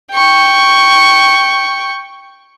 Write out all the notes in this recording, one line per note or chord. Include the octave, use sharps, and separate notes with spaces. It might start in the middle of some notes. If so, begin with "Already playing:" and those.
G5 C#6